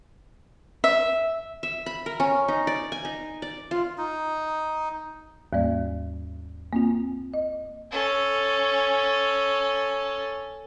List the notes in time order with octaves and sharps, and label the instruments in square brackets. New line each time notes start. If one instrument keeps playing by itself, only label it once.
[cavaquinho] E5
[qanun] E5
B5
A#4
C#4
D#4
D5
G#5
D#4
D5
F4
[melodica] D#4
[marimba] D#2 G#2 G3 A#3 D5
A#3 C4 F4
D#5
[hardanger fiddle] C#4 A4